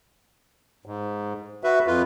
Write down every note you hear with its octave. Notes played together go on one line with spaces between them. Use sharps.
G#2
F#4 B4 E5
F2 F4 B4